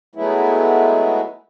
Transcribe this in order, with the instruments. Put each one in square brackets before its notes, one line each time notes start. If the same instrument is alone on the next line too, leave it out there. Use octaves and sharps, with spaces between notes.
[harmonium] F#3 G#3 A3 B3 E4